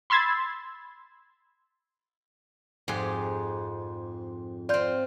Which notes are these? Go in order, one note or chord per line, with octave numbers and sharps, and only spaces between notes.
B5 C6 E6 G#6 A6
F2 G#2 G4 G#4
C4 F4 D5 G6